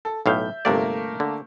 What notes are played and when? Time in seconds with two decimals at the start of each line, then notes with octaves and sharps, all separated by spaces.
0.05 A4
0.26 B1 A2 E5 F5 G6
0.65 G1 C3 A3 A#3 A#4 D5
1.20 D3